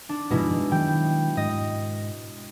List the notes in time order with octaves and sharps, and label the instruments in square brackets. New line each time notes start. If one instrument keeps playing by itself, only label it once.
[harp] D4
[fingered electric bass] F#1 G#2 F3 [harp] B2 G#3 E4
[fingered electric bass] D#3 F#3 [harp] G5
[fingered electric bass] G#2 [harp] D#5